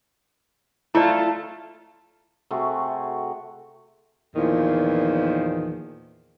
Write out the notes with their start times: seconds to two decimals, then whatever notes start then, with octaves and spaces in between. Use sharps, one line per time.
0.95 A3 E4 F4 D5 A5
2.51 C3 A3 F#4 G#4
4.35 E2 A#2 D#3 F3